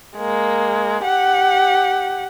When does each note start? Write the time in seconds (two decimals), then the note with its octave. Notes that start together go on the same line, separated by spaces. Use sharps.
0.17 G#3 A#3
1.04 G4 F#5